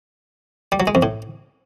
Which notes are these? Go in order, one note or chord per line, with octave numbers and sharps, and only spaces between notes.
G3
F#3
G#3
F2
A2